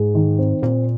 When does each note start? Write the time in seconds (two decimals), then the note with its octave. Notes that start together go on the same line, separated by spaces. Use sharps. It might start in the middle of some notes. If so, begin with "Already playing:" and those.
Already playing: G#2 G#3
0.15 D#3
0.39 C4
0.62 A#2 C4